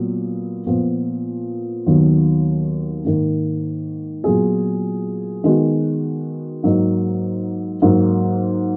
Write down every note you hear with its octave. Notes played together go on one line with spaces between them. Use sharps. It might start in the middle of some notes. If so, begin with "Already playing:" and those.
Already playing: A#2 F#3 B3
A#2 F3 B3
D#2 D#3 F#3 B3
G#2 D#3 A#3
A#2 F#3 B3 F4 G#4
D#3 G#3 B3 F#4
G#2 F#3 A#3 D#4
G#2 F#3 A#3 D#4